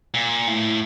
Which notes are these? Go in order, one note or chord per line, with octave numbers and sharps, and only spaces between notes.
A#2
A2